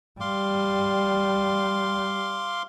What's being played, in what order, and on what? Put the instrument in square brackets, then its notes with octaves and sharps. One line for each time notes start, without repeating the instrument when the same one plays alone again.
[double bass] G3 [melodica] F5 C6 D6